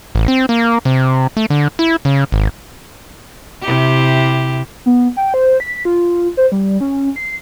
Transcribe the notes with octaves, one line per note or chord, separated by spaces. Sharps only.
A1
C4
A#3
C3
A3
D3
E4
C#3
G#1
C3 E4 G4
B3
G5
C5
B6
F4
C5
G3
C#4
C7